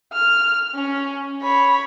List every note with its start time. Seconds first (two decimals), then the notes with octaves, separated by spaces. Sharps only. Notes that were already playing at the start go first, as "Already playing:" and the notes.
0.13 F6
0.74 C#4
1.42 C#5 B5